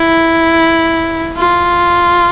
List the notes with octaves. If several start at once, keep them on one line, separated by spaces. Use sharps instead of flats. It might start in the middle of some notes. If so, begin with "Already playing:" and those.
Already playing: E4
F4